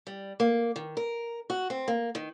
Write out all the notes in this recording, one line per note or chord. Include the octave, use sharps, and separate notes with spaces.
G3
A#3
D#3
A#4
F#4
C4
A#3
D#3